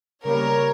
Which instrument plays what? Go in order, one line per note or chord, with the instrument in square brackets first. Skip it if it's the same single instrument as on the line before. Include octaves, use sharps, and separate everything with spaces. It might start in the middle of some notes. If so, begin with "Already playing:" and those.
[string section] C#3 G3 A#3 A#4 C#5